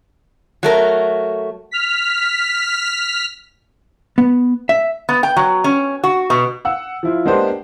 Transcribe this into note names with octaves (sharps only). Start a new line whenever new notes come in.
F#3 A3 A#4
F6 B6
B3
E5
B3
G5
F#3
C#4
F#4
B2
F#5 E6
F3 E4 F4
G#3 A#3 B3 D4 G4 C5